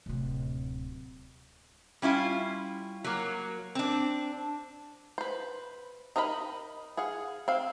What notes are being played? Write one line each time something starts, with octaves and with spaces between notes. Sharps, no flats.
D1 C3
G3 C#4 E4 F4
F#3 A#3
C4 D4
B4 C5
D#4 A#4 D#5 E5 B5
G#4 F5 F#5
C4 F5